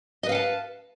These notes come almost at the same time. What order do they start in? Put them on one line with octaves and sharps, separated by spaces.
D#5 B4 F5 F#5 A5